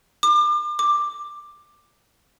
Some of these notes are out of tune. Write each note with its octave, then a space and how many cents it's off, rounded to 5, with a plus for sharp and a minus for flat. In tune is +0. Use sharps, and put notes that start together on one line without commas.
D6 +35
D6 +10